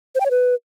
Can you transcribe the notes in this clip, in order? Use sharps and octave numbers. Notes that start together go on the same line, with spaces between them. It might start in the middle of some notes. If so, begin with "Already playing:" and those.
C5
G5
C#5
B4